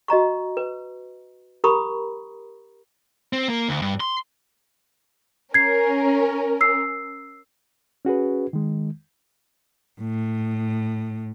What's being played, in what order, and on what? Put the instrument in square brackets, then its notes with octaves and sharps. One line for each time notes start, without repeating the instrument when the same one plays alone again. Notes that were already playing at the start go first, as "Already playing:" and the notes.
[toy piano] F#4 D#5 A#5 C#6
B4
G4 A#4 A#5 B5 C#6 D#6
[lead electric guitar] C4
A#3
D2
G2
C6
[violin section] C#4 A#4 [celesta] G#6 C7
[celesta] E6 C7
[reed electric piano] C#4 F#4 G#4 B4
D#3 G#3
[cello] A2